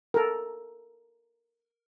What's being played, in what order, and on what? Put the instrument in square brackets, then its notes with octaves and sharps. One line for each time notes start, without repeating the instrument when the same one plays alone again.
[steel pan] A4 A#4